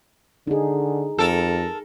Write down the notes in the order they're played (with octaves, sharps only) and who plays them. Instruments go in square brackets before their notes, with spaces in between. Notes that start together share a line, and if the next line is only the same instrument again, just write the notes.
[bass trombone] D3 [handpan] D#4 G#4
[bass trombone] F2 [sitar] A4 A#4